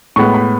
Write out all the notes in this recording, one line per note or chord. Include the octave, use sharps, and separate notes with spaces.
A2 G#3 B3 C#6
B5